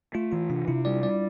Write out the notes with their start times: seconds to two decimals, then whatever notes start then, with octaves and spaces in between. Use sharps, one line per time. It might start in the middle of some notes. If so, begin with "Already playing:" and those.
0.15 A3 F4
0.32 E3 F4
0.50 C3 D4
0.68 C3 E4
0.85 G3 D5
1.03 G3 D5